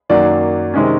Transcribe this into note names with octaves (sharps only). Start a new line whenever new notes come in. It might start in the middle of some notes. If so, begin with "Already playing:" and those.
F#2 D#3 F#3 A#3 D5
C3 D#3 G#3 C#4